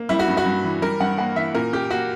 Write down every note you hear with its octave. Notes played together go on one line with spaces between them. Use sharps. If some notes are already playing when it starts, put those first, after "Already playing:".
Already playing: A#3
G3 E4
F#4
G2
F#4
G2
E3
G3 A#4
G2 F#5
A#3 F#5
E3 E5
A#2 A#4
A#2 G4
A#3 F#4